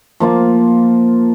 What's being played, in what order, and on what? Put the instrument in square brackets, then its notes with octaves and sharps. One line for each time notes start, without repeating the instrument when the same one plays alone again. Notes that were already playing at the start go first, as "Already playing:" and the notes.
[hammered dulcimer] F3 A#3 F4